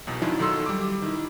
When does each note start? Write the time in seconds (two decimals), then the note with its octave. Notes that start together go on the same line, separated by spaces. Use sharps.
0.07 B1 E2 B2
0.22 D#3 F3 F#3 D4 E4
0.39 B1 D#3 F#3 A4 C6 E6
0.66 G3 D6
1.02 D#3 E4